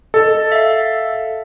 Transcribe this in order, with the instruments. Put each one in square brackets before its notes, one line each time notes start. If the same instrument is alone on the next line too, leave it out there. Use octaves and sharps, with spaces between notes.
[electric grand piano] A4 [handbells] D#5
[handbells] E5 F5